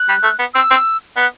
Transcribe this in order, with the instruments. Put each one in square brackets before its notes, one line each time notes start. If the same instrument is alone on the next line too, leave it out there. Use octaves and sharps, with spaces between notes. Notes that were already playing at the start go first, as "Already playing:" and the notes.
Already playing: [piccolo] F#6
[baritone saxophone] G3
A3
B3
[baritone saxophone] C4 [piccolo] E6
[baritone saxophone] C4
[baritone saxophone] B3 [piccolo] F#6